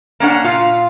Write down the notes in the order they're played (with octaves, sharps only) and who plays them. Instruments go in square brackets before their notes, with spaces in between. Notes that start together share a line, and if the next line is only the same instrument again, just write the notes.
[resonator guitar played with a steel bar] A#3 C#4 D4 F#5
A#2 F4